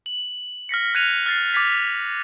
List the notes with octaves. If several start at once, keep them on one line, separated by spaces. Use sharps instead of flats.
F#7
F6 A#6 B6 C#7
F6 F#6 G#6 C#7 D#7 F7
F6 A6 C7
D6 F6 G#6 A6 B6 D#7